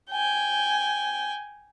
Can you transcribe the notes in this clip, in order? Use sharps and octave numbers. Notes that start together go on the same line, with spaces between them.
G5 G#5